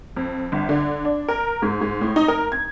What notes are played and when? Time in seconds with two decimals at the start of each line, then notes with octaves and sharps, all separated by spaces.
0.16 F2
0.52 G1
0.69 D3
1.05 D4
1.28 A#4
1.62 G#2
1.81 G#2
2.01 A2
2.16 D#4
2.28 A#4
2.52 G#6